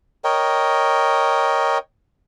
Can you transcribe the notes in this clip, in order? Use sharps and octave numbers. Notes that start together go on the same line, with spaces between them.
A#4 C#5 D#5 G5